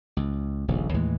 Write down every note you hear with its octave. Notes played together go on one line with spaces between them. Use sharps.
C#2
D#1 A#1 C#3
D#2 A2 E3 G#3